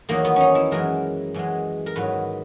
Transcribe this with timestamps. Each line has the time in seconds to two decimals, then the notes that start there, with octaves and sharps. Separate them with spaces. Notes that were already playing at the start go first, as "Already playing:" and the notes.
0.09 E2 D#3 F#3 A#3
0.25 B3
0.36 C#4 D#4
0.55 E4
0.71 F#2 E3 G#3 A#4
1.34 F#2 E3 G#3
1.86 A#4
1.96 G#2 D#3 F#3 B4